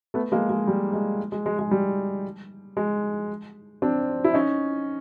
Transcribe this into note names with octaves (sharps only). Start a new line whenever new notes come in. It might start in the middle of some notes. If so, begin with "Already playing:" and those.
A3 B3
G#3 A#3
G#3
G3
G#3
G#3
G#3
G#3
G3
G#3
C4 D4
E4
C#4 D#4